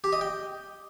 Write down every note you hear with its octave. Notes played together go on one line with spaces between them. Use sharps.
G4
D#5
G5